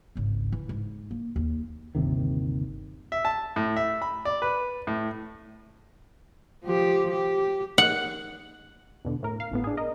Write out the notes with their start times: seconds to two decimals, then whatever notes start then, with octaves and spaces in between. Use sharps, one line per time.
0.16 G#1 C#2
0.52 E3 E4
0.69 G#2
1.11 A#3
1.36 D#2
1.95 G1 D#2 C3 D#3
3.12 E5
3.25 A5
3.56 A2
3.76 E5
4.02 B5
4.25 D5
4.42 B4
4.87 A2
6.64 F3 G4
7.11 G4
7.78 F#5
9.05 E2 B2 D3
9.23 A2 A#4
9.40 F5
9.51 G#1 A2 B3
9.64 D4 G#4
9.77 A#4 D#5